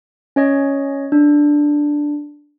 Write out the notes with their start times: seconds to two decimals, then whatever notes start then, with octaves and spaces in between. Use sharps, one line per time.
0.36 C#4 C#5 D#5
1.12 D4